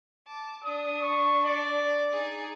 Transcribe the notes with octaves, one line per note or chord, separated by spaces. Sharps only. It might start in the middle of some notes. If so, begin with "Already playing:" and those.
A5 D6
D4 D#6
C#6
D5
D#4 G#4